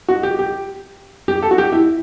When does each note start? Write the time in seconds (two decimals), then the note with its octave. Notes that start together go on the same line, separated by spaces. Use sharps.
0.09 F#4
0.23 G4
0.39 G4
1.28 G4
1.43 A4
1.51 F#4
1.58 G4
1.72 E4